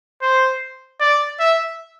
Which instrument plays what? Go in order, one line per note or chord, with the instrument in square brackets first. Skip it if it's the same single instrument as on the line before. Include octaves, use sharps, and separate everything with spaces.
[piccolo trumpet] C5
D5
E5